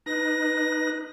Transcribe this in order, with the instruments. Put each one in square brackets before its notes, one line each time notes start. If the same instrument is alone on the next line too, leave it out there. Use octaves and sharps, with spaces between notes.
[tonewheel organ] D#4 B4 [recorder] A#6